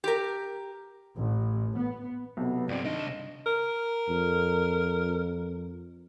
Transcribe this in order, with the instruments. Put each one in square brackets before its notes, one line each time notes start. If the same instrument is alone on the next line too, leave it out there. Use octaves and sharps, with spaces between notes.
[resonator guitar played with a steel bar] G4 A#4
[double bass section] A1
B3
[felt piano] B1 C3 [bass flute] B3
[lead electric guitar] G2 C4 [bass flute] D5
[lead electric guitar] C2 D#5 [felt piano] D#3 [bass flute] D4
[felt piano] E7
[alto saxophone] A#4
[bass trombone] F2